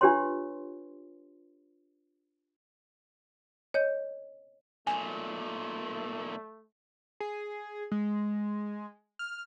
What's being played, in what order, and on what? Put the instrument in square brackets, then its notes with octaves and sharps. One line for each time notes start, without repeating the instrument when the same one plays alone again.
[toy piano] D4 F4 G4 B4 C#5 C6
[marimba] C#5 D#5 G6
[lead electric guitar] B1 A#2 [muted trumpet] A3 [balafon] G#5
[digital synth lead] G#4
G#3
F6